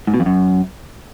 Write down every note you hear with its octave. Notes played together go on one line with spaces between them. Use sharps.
G#2
B2
F2
F#2